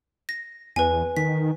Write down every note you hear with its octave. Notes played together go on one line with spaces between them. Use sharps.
A#6
E2 B4 G#5
D#3 B6